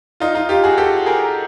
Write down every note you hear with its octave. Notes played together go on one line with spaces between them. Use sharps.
D#4 F4
D#4 F4
F4 G4
F#4 G#4
G4 A4
G#4 A#4